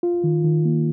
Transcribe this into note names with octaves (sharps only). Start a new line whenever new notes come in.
F4
D#3
D#3
A#3